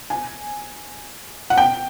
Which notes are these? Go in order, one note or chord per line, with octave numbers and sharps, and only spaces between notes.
G#5
F#5
G5